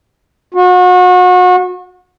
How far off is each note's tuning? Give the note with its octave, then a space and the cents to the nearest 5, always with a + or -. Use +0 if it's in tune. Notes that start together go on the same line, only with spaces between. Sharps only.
F#4 -35